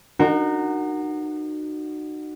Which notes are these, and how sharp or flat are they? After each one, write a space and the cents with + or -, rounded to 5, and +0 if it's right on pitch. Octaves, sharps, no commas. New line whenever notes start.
D#4 -40 F#4 +0 A#4 -15